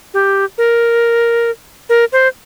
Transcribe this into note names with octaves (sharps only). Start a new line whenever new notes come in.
G4
A#4
A#4
C5